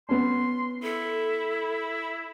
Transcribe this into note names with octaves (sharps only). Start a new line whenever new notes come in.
B3 C#4 C6
E4 A4